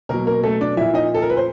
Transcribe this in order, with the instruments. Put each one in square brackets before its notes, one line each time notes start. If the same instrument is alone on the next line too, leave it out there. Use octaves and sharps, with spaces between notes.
[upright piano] B2 F#3 A#3 A#4
A#3 A#4
A3 A4
D4 D5
A#2 F3 E4 E5
D#4 D#5
A4
A#4
B4
C5